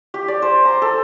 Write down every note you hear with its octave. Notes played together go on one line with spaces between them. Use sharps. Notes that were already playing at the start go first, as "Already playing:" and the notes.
G4
D5
C5
A#5
A4